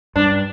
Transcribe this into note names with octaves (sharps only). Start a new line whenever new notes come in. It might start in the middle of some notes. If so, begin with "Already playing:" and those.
G2 D4